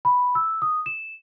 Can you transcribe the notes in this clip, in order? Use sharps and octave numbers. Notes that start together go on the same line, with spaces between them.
B5
E6
D#6
E7